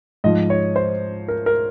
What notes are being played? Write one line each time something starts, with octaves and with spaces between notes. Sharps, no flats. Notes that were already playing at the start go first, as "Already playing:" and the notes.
G#2 F3 D#5
C#5
C5
A#4
A#4